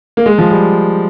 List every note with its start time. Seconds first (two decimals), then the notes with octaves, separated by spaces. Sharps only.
0.17 A#3
0.26 G#3
0.38 F3
0.51 G3